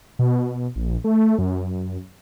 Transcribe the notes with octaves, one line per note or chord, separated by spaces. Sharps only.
B2
A#1
A3
F#2